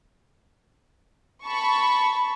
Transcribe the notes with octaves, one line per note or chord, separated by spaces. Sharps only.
A5 B5 C#6